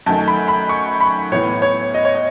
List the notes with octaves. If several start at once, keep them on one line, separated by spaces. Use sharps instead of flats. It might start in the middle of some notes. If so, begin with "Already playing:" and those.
F#2 D#3 A3 A5
B5
B5
C#6
B5
A2 E3 B3 C#5
C#5
D#5
C#5
D#5